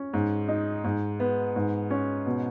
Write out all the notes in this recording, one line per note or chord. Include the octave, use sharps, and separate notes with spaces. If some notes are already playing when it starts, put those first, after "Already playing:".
Already playing: C#4
G#2
D#4
G#2
B3
G#2
C#4
B2